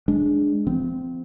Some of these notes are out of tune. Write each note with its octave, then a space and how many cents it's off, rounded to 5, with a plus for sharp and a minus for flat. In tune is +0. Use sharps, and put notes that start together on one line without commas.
G#3 +5 D4 +0
F3 -10 C4 -25